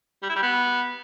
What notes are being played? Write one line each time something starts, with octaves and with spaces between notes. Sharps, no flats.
G3
E4
G3
B3